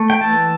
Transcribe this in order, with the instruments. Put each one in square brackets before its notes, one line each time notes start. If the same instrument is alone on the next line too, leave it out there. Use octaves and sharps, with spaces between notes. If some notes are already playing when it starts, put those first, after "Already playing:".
Already playing: [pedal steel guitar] A3
G5
E3 A5